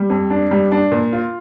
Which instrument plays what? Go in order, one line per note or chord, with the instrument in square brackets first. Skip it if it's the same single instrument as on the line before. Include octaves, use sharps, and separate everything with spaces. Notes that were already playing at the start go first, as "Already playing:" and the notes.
Already playing: [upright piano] G3
F2
D4
G3
D4
A#2
F4